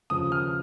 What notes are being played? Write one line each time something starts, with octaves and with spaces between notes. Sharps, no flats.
D#2 C#3 F3 D#6
F6